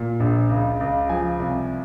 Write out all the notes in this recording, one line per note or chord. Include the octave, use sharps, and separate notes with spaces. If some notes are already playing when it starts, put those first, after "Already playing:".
Already playing: A#2
A#1
C#2
C#2
F3 G#5
C2